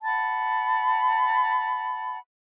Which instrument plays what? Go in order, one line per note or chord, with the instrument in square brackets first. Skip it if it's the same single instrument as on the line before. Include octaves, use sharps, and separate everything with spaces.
[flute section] F#5 A5 B5